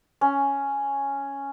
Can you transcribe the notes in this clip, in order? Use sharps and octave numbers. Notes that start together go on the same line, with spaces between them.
C#4